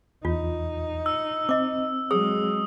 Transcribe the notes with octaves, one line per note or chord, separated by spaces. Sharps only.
E2 D#4 F4
E6
C4 D#5 D6
F#3 G#3 G#4 D#6